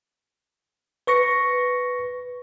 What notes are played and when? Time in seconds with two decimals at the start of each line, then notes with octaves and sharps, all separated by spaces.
1.07 B4 C#6 A#6 C#7